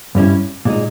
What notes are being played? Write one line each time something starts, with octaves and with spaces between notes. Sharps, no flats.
G2 G3 C#4 E4
A#2 G#3 D#4